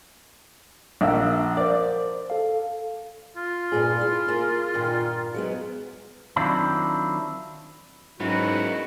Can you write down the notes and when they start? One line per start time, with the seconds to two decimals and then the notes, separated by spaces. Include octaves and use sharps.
1.01 A#1 E5 F#5 E6
1.57 A#4 C5 D5
2.30 A4 F5
3.37 F4
3.72 G2 A#2 G#4
4.01 E4
4.28 A#3 G#4
4.74 G2 A#2 D#3
5.34 F#3 G#3 B3
6.36 D#3 F#3 C4 D4 E4 F4
8.20 G#2 D#3 F#3 B3 C#4 E4 F#4